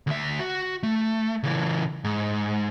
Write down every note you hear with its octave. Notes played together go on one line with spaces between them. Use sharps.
D2 E5
F#4
A3
C#3 E3
G#2